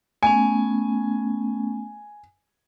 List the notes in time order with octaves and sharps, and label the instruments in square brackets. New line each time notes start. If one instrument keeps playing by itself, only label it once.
[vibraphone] A3 B3 C#4 [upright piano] G#5